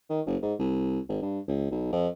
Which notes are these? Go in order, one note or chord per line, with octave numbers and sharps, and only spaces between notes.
D#3
F#1
G#2
C2
G#1
G2
C#2
B1
F2